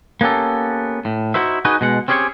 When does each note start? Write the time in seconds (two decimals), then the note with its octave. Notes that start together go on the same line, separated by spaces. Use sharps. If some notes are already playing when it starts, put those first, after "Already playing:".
0.21 A#3 B3 C#4 G4 A4
1.05 A2
1.34 D#4 E4 F#4 B4 C5 E5
1.65 D#4 F#4 G#4 B4 D#5
1.81 B2 G#3 F#5
2.08 C4 C#4 G4 G#4 B4 C#5